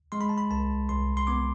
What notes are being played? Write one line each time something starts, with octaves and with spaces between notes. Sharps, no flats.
G#3 C6
B5
A5
B5
C2 A5
C2 C6
C6
B3 D6